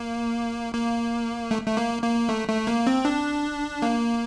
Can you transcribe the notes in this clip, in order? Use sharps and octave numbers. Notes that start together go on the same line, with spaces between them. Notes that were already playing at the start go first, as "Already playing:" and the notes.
Already playing: A#3
A#3
A3
A3
A#3
A#3
A3
A3
A#3
C4
D4
A#3